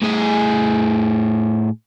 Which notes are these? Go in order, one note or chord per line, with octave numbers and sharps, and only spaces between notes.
A2 G#4